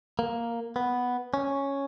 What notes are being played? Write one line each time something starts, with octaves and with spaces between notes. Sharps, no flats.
A#3
B3
C#4